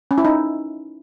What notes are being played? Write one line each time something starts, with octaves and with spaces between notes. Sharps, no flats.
C#4
E4
D#4